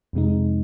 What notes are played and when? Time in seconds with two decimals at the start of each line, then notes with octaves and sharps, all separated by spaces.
0.13 F2 C3 G#3 D#4